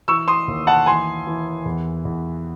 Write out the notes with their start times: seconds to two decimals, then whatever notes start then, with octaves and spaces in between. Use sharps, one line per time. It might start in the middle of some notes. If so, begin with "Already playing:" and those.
0.08 E3 C#6 E6
0.28 C6 D#6
0.47 D#2
0.67 F#5 A5
0.86 E3 G#5 C6
1.27 E3
1.65 E2
2.05 E2